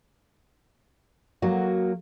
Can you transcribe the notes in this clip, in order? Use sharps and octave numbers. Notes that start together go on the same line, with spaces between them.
F#3 A#3 F#4